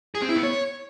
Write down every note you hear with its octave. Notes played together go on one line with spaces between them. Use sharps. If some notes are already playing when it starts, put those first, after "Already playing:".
G#4
C4
E4
B3
C#5